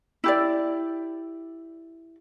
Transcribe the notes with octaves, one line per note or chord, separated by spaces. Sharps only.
E4 G4 D5